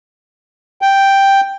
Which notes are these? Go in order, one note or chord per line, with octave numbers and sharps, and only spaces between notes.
G5